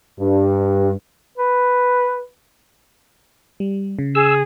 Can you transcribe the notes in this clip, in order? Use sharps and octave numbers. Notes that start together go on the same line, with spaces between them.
G2
B4
G3
C#3
G#4 E6